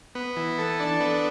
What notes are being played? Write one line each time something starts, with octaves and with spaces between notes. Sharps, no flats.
B3
E3
A4
D4
B3